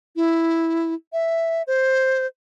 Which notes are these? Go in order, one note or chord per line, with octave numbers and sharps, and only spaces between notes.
E4
E5
C5